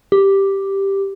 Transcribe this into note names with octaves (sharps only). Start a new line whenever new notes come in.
G4